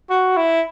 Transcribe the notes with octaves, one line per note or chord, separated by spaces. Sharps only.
F#4
E4